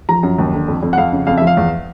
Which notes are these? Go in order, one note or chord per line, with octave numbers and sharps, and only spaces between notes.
F3 A#5
F#2
D#2
D3
F2
F2
F#5
F2 F5
C#3
F2 F5
E5
F3
F5
E2